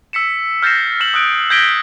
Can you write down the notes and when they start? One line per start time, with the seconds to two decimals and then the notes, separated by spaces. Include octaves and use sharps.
0.13 E6 B6 C#7 E7
0.63 F6 G6 A6 A#6 C7 E7
1.01 F6 E7 F#7
1.14 D#6 E6 F#6 D7
1.50 G6 G#6 A#6 B6 D7 G7